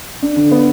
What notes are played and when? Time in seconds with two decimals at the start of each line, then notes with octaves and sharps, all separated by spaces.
0.22 D4
0.36 D3
0.51 B3